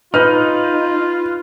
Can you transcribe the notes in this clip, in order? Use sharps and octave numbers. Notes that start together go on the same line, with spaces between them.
D#4 F4 B4 F6